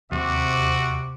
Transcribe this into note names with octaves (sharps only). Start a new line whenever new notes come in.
D#2 C3 G3 F#4 E5 D6